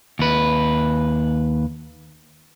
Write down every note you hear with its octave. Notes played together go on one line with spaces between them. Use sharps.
D#2 B4